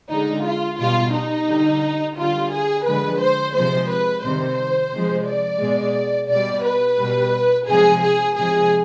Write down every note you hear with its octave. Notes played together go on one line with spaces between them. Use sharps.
D3 G#3 D#4
F4
B2 G3 F4
D#4
D3 G3
D3 G3 F4
G#4
D3 F3 G#3 B4
C5
C3 F3 G#3 C5
B4
C3 D#3 G3 C5
C3 F3 G#3
D5
B2 G#3
B2 G3 D5
B4
B2 G3
C3 F3 G#3 G#4
G#4
C3 F3 G#3 G#4